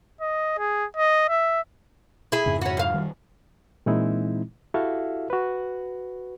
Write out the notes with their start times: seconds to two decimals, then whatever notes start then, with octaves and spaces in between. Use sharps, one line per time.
0.21 D#5
0.58 G#4
0.97 D#5
1.29 E5
2.32 E4 G#4
2.46 F2 G#2 C#3
2.61 C#4 F#4
2.77 F#2 F5
2.94 D#3 G3
3.86 A#2 E3 G#3 C4 D#4 E4
4.74 E4 F#4 G4 A4 E5 F5
5.30 F#4 B4